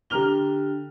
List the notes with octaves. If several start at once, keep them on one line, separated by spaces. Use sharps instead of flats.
D3 G4 A#5 F6 F7 G7